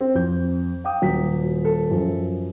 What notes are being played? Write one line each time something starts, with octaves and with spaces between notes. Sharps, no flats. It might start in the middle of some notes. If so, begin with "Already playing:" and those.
C4
F2 G6
F5 G5 D#6
D#1 F#3 B6
A4
F#2 F3